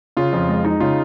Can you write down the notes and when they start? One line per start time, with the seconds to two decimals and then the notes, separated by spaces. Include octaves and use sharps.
0.17 C#3 F4
0.33 F2
0.49 G#3
0.65 D#4
0.80 C#3 F4